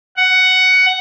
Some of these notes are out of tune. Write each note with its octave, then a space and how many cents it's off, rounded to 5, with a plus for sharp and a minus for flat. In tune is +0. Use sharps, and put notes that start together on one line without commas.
F#5 +10